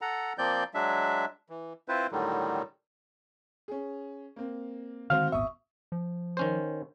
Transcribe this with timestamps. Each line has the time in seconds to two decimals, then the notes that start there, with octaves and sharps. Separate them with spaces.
0.01 A4 F#5 A#5
0.38 F3 A#3 C4 D5 G6
0.74 F#3 G#3 D4 E5
1.50 E3
1.88 C4 E4 F4 B4 C5
2.12 A2 D3 D#3 F#3 G3
3.68 C#4 G#4
4.36 A#3 C4
5.10 D3 D#3 G#3 C4 F#4 C5 F5 F6
5.32 D#1 G#1 B3 E5 C#6 D#6
5.92 F3
6.37 D#3 C#4 C5